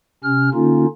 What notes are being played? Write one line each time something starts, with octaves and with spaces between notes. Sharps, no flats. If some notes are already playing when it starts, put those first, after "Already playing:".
C3 C#4 F6
D3 A#3 C#4 D#4 F4